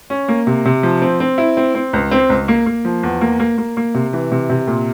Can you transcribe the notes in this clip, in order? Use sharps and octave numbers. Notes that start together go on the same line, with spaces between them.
C#4
A#3
C3
C3
F3
C4
C4
E4
C4
C4
C#2
C4
C#2
A#3
A#3
F3
E2
A#3
A#3
A#3
A#3
C3
E3
C3
C3
A#2